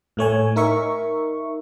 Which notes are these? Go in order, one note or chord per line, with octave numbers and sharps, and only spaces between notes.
A2 A3 C#5 G#5
D#4 A#4 E5 C#6